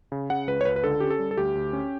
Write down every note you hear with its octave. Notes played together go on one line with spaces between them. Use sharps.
C#3
C#3 F#5
C#2 B4
C#5
C#2 B4
B4
D3 A4
C#4 G4
A4
G3
A4
D2 G4
D2
C#4